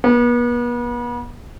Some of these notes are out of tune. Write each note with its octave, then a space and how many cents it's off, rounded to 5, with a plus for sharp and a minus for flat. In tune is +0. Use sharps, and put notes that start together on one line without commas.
B3 -40